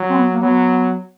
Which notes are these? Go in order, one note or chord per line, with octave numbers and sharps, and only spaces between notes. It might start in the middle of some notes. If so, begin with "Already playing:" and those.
Already playing: F#3
C4
B3
A#3
F#3 B3